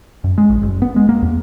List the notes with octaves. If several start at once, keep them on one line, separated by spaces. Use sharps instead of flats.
F#2
G#3
A#1
F#1
B3
G#3
A#3
E2